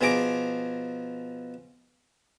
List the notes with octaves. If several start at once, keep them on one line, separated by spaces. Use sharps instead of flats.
B2 F3 G#4 A#5 D6